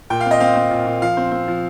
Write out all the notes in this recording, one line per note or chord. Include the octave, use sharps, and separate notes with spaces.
A#2 G5
F5
C4
D#5
C4 F5
C4
A#2
A#2
F3 F5
C4
C4
F3